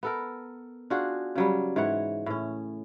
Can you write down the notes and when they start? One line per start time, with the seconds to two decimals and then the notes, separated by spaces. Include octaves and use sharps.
0.03 B3 A4 A#4
0.90 D4 F4 F#4 G#4
1.35 C#3 F#3 G3
1.76 G#2 E3 C#5 F#5
2.26 A2 C#4